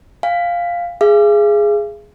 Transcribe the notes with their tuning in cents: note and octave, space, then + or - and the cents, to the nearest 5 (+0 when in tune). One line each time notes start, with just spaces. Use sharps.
F5 +0 G#5 -45
G#4 +0 F5 -45